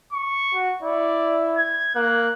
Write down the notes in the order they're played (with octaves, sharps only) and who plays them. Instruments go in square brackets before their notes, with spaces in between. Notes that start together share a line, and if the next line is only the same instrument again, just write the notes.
[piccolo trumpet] C#6
[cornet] F#4
[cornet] E4 [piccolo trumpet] D5
[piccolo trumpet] G#6
[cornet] A#3 [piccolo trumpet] F#6